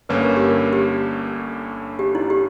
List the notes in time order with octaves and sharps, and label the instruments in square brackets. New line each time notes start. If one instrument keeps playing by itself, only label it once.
[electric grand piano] G1 G2 D3 A#3 C#4 [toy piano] B4
[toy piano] A#4
G4
A#4
G4
G4
E4
G4